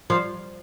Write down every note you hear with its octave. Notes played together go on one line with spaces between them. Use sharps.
F3